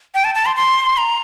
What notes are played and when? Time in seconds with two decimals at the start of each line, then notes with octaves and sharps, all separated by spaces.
0.15 G5
0.24 A5
0.35 A5
0.46 C6
0.56 C6
0.97 A#5